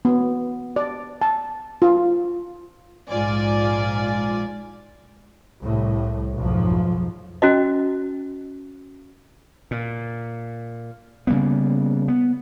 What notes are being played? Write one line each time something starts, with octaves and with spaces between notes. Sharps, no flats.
B3
D5
A5
F4
A#1 G#2 F4 D5 G#5
C2 A2
B1 F2 G#2 F3
C#4 F#4 D#5
A#2
C#3 G3 A#3 B3
B3